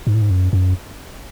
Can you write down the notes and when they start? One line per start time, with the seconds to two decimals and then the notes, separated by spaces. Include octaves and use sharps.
0.07 G#2
0.14 A2
0.22 G#2
0.30 F#2
0.53 F#2